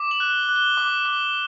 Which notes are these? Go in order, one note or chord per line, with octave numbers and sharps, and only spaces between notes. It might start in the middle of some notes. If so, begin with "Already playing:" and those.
Already playing: D6
F#7
F#6
G7
F#7
F#6
G7
D6
D6